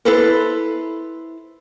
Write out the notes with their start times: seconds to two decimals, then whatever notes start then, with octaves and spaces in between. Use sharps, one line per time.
0.05 E4 A4 B4 C5